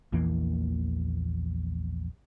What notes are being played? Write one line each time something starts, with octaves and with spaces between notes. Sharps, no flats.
A#1 E2 E3 A#3